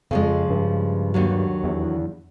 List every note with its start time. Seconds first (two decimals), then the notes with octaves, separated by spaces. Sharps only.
0.11 F2 C#3 F3 G#3
0.50 G2
1.14 D#2 D3 F#3
1.64 E2